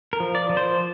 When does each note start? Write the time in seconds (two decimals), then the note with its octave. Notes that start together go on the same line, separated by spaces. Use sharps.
0.13 A#4
0.20 F3
0.35 D5
0.50 F3
0.57 C5